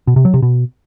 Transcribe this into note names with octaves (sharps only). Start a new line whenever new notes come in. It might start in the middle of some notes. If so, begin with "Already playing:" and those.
B2
C3
F#3
C3
B2